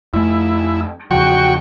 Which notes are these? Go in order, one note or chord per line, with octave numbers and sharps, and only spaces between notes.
F2 A3 E4
E2 C#3 F3 F#4 G5 C#6